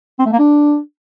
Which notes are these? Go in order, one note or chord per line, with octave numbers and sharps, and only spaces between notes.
C4
A3
A#3
D4